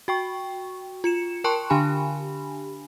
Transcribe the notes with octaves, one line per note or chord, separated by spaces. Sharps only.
F#4 G5 C#6
F4 C#7 E7
A#4 G5 A5 C6 C#6 F#6
D3 D4 G4 G#5 B5